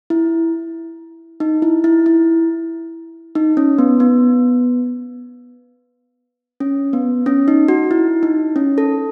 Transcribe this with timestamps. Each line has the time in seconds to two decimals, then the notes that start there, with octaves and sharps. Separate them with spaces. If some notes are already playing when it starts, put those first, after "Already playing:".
0.10 E4
1.40 D#4
1.62 E4
1.84 E4
2.06 E4
3.35 D#4
3.57 C#4
3.78 B3
4.00 B3
6.60 C#4
6.93 B3
7.26 C#4
7.48 D#4
7.68 F#4
7.91 E4
8.23 D#4
8.56 C#4
8.78 A4